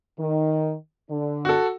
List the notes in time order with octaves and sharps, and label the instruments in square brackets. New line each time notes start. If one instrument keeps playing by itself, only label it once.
[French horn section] D#3
D3 D4
[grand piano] F#4 A4